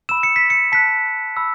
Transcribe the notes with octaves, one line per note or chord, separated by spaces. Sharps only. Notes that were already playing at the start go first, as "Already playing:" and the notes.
B5 E6 E7
C#7
B6
C#7
A5 F#6 B6
B5 E6